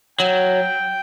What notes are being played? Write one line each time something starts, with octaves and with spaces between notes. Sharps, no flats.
F#3 G5